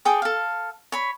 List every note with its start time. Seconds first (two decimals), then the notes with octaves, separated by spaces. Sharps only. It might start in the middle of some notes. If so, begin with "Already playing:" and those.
0.05 G#4 A4 G5 D6
0.22 A4 F5
0.92 C#5 B5